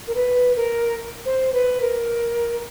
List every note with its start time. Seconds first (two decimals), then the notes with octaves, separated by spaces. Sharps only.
0.08 A#4
0.15 B4
0.56 A#4
1.26 C5
1.53 B4
1.81 A#4